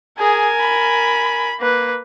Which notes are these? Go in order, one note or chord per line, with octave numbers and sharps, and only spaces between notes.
G#4 A#4 G#5
B5
A#3 B4